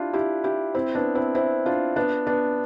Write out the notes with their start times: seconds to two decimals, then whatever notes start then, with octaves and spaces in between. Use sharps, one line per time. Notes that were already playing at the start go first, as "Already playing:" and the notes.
Already playing: D4 E4 F4 G4
0.13 E4 G4
0.44 E4 G4
0.74 C4 E4
0.95 B3 D4
1.15 C4 E4
1.35 C4 E4
1.66 D4 F4
1.96 B3 D4
2.27 B3 D4